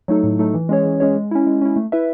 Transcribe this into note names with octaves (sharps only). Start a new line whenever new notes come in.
F#3 A3 D#4 A4
A2
F#3 A3 D#4 A4
E3
G#3 C#4 G#4 C#5
E3
G#3 C#4 G#4 C#5
G#3
C#4 E4
G#3
C#4 E4
A3
E4 B4 E5